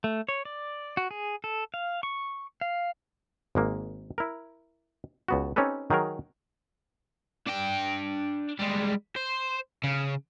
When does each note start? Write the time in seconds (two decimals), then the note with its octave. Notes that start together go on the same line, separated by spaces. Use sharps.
0.04 A3
0.29 C#5
0.45 D5
0.97 F#4
1.11 G#4
1.44 A4
1.74 F5
2.03 C#6
2.61 F5
3.55 G#1 G#3 A#3
4.18 E4 A#4
5.28 C#2 B3 F#4
5.56 C4 C#4 D#4 G4 A4 B4
5.90 D#3 F#3 G#4 A#4
7.47 D4 G5
8.59 G3 G#3
9.16 C5
9.84 C#3